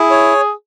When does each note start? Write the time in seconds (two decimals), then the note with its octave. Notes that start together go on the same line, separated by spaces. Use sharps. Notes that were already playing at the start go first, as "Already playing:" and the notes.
Already playing: E4 G#4
0.10 C#5